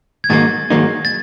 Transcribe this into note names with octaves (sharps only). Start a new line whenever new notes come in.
G#6
G#2 D#3 F#3 A#3 D#4 A6
G#2 D#3 F#3 A#3 D#4
A6